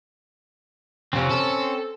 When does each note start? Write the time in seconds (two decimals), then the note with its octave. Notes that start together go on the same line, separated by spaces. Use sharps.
1.13 F2 C3 C4 C#4
1.30 A4